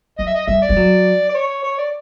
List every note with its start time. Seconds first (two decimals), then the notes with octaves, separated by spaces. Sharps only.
0.18 F#3 D#5
0.27 E5
0.35 D#5
0.47 G3 E5
0.62 D5
0.69 G3
0.76 F#3
1.29 D5
1.34 C#5
1.63 C#5
1.78 D5